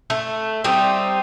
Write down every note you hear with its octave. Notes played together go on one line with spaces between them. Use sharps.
A3
G3 C4 D#4 G4